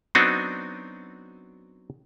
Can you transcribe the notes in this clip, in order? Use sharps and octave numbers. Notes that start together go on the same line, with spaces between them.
F#3 B3 C4 D4 D#4 F#4